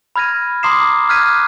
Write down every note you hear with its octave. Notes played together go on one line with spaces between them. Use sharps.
B5 F6 G#6 A#6 D#7
A#5 C6 D6 D#6 C7 E7
D6 F6 F#6 G#6 B6 D#7